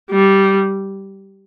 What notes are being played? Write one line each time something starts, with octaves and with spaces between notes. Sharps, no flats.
G3